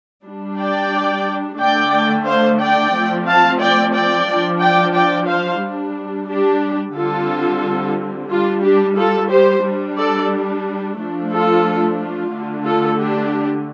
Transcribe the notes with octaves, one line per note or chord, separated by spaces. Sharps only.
G3 D4
D5 G5
D3 A3 D4 D5 G5
C5 F5
D5 G5
F3 A3 C4
F5 A5
D5 G5
D5 G5
F3 D4
D5 G5
D5 G5
C5 F5
G3 D4
D4 G4
D3 G3 C4 F4 A4
G3 D4 F4
D4 G4
F4 A4
G4 C5
G3 D4
A4 D5
F3 A3 D4
F4 A4
F4
D3 A3 D4
F4 A4
D4 G4